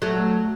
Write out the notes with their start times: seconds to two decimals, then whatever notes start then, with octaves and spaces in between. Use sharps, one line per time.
0.02 F#3 A3